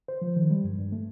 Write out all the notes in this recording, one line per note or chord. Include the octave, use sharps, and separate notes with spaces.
C5
F3
D#3
G3
G2
G2
A3